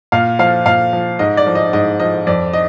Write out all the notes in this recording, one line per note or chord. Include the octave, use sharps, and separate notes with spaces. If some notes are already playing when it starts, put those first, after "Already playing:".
A#2 F5
F3 F5
A#2 F5
F3
G#2 D#5
D5
F3
D#5
G#2 D#5
F3 D#5
F2 D5
D#5